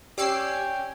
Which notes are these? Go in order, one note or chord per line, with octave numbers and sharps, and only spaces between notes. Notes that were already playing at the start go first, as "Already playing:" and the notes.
C#4 G4 D5 G5 D6 E6 C7